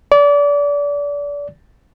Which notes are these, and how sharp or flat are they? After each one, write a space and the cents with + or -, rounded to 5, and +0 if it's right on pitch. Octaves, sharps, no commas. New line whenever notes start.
D5 -30